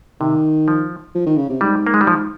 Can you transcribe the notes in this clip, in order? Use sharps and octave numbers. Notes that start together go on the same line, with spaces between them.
C3 D#3
F3
F3
D#3
C#3
C3
G#2 G3
A#3
G#3
G3
F3